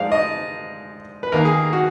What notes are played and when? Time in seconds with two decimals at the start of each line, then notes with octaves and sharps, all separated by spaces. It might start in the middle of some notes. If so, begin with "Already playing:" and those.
Already playing: G#2 F3 G#3 D5 F5
0.12 D#5
1.23 B4
1.32 D#2 D#3 A#3 A#4
1.45 G#4
1.73 F#4